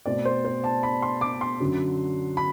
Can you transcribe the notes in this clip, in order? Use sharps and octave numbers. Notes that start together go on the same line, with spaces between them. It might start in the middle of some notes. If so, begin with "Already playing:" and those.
B2 A3 C4 D5
C5
C5
A5
B5
C6
D6
C6
F#2 D3 F#3
B5